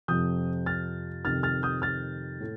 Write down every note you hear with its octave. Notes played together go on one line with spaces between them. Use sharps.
F2 C3 F3 D#6 G6
F6 A6
F2 C3 D#3 F6 A6
F6 A6
D#6 G6
F6 A6
A2 A3